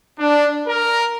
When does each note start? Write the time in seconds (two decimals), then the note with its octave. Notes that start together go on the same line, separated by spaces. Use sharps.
0.19 D4
0.67 A#4